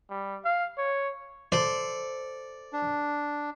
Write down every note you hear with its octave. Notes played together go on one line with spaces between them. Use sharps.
G3
F5
C#5
A4 C5 D5
D4